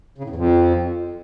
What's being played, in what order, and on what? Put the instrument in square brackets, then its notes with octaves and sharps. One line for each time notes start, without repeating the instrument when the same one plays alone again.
[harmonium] C#3
A2
E2
F2